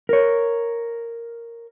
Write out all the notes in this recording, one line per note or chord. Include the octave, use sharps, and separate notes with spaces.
A#4 C#5